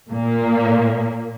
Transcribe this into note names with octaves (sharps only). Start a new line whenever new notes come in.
A#2 A#3